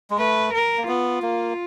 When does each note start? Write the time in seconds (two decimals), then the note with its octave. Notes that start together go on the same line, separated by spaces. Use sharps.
0.10 G#3
0.18 A3 B4
0.53 A#4
0.77 A#3
0.87 B3 F4
1.22 A#3